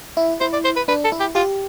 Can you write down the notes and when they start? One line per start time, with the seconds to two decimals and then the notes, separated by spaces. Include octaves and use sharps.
0.17 E4
0.41 E4 C5
0.53 D5
0.64 C5
0.76 B4
0.88 D4 B4
1.04 A4
1.12 E4
1.20 G4
1.35 F4 G4